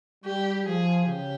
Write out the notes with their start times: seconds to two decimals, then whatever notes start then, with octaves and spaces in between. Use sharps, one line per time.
0.24 G3 G4
0.65 F3 G#4
1.06 C#3 G4